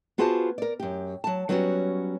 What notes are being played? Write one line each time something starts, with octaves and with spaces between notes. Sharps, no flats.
B3 F4 F#4 G#4 C5 A5
A#4 D5
F#2 G4
F#3 A5
F#3 G3 B3 C#4 D#4 F#4